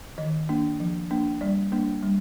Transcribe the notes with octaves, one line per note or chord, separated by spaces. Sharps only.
D#3 D#5
A#3 D4
F3
A#3 D4
G3 D5
A#3 D4
G3